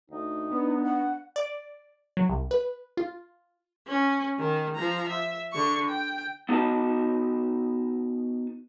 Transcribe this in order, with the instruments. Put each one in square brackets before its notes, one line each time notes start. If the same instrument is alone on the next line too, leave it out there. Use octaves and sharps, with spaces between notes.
[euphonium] D2 [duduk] D#4
[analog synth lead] B3 [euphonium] D4 [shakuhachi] B4
[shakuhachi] F#5
[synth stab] D5
F#3
C2
B4
F4
[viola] C#4
D#3
F3 A#5
E5
D3 C#6
G5
[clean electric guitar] B3 D#4 F#4 D#5 A5